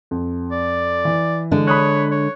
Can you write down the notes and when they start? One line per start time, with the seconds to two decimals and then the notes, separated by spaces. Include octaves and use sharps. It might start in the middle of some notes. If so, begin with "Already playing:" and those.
0.11 F2
0.52 D5
1.05 E3
1.51 D3 G#3 D4
1.68 C#5 B5 D#6 F#6
2.11 C#5